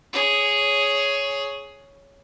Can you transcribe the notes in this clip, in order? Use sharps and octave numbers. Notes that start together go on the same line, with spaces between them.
G#4 C#5